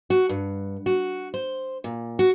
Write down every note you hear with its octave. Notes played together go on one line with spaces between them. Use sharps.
F#4
G2
F#4
C5
A#2
F#4